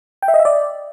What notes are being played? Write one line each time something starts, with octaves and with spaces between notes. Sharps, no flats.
G5
E5
D#5
E5
D5